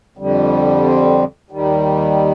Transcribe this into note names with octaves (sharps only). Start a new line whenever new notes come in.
F2 D3 G3
C4
D#2 D#3 G3